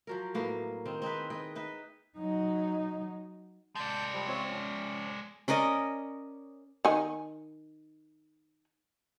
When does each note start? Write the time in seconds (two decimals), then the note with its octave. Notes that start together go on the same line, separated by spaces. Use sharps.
0.07 F3 F#3 A#4
0.34 A2 A#3 B3
0.86 D#3 C4
1.02 C4 D#4 G#4 B4
1.30 G#4 B4 D#5 G5
1.55 D#4 B4 E5
2.18 F#3 D#4
3.75 G#3 D5 A5 G6
4.13 F3 G3
4.27 C4 F4 C#5
4.50 F3 C#4
5.48 C#4 A#4 D5 D#5
6.85 D#3 G#5